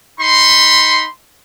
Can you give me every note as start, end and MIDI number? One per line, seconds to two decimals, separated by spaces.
0.20 1.05 63
0.20 1.05 83
0.20 1.05 84